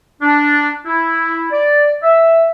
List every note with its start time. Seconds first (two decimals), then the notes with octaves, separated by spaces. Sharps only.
0.22 D4
0.86 E4
1.52 D5
2.03 E5